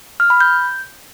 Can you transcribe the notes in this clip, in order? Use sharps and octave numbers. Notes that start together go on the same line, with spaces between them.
F6
B5
G6